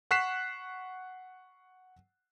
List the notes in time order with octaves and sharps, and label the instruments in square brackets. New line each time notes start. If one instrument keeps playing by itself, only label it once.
[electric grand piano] F#5 C#6 F#6 B6 C7 E7